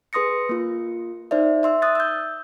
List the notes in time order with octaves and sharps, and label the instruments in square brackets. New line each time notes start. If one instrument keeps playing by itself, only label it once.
[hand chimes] G#4 B4 C6 D#6 A#6 C#7
A#3 F4
D#4 C5 D5 E5
E5 C6 E6
D#6 F#6 A6
E6 G6